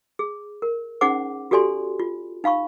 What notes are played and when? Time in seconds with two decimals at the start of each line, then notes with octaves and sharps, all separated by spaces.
0.19 G#4
0.62 A#4
1.01 C#4 D#4 G#4 C5 F#5 D6
1.51 F#4 G4 A4 D5 G#5 C6
2.00 F4
2.44 D#4 F5 B5 C#6